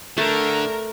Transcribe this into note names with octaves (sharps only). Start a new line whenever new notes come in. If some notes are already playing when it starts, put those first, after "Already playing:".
D3 A3 A#4